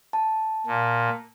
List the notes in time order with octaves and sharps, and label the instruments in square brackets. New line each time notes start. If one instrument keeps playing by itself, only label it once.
[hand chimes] A5
[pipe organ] A#2